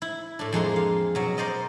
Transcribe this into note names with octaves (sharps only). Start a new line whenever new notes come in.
E4
A2 D4
F2 G#3 A#3 C6
F5
B2 F#3
A#4 C5 D5 D#5 A#5